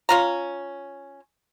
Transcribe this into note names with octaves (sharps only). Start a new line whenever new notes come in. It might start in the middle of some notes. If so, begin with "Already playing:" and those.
C#4 F4 A#5